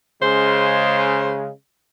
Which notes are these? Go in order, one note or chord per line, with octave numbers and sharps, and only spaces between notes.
C#3 G#3 C5